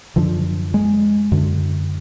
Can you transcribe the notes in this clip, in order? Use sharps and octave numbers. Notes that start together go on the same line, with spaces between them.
F#2 D3 F3
G#3
F#2 D3